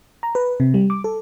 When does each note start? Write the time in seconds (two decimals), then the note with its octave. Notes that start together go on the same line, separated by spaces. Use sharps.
0.23 A#5
0.35 B4
0.60 C3
0.74 G3
0.90 D6
1.04 A4